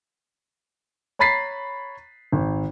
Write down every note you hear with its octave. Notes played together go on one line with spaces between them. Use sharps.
C#5 A#5 B5 A6 B6 C7
G#1